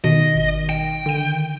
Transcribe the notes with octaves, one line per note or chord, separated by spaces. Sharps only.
B2 D#3 D#5
G#1
G5
D3 D#7